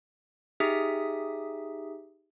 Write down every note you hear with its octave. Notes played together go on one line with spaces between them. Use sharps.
D#4 G4 G#4 E5 D#6 B6